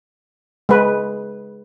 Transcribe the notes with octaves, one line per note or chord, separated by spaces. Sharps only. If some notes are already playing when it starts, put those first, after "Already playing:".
G#3 B4